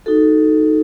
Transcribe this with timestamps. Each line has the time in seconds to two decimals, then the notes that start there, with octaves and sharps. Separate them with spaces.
0.06 D#4 F#4 A4